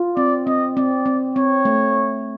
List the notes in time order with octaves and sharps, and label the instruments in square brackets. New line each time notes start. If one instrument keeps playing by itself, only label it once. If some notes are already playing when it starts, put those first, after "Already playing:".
Already playing: [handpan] F4
[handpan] C4 [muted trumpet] D5
[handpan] C4 [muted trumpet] D#5
[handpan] C4 [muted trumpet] D5
[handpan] C4
[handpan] C4 [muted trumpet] C#5
[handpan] A3